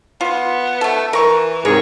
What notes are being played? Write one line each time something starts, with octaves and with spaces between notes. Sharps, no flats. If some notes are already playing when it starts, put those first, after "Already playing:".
B3 F4
A3 A4
E3 A#4 C#6
G#2 C3 G#4 A#4 C#5